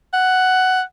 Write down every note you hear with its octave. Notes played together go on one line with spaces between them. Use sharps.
F#5